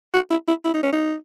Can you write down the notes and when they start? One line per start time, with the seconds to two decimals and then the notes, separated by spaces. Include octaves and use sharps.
0.14 F#4
0.31 E4
0.48 E4
0.65 E4
0.74 D#4
0.83 C#4
0.93 D#4